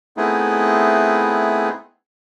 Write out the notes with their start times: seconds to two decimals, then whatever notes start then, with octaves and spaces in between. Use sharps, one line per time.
0.17 A3 B3 C4 D#4 E4 G#4